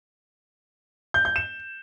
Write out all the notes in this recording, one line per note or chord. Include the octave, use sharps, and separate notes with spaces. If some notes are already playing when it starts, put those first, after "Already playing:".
G6
G6
E7